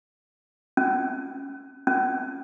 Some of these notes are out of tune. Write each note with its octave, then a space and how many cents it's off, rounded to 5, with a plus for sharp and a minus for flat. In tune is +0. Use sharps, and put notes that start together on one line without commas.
C#4 -5
C#4 -5